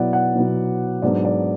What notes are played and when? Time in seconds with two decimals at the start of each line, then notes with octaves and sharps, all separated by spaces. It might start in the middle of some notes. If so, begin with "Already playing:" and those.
Already playing: B2 F#3 B3 E4 D5 F#5
0.13 F#5
0.35 B2 F#3 B3 E4
1.02 G#2 F#3 B3 D4 D5
1.25 D5